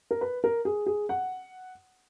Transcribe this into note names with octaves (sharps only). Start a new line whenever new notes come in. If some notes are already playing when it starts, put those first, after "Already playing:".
A#4
B4
A#4
G#4
G#4
F#5